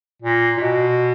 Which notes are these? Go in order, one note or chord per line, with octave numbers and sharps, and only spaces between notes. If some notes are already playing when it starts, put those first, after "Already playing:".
A#2
A#2
B2